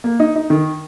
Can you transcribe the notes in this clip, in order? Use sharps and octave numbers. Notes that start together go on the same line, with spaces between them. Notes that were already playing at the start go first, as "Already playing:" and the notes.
A#3
D#4
D#4
D#3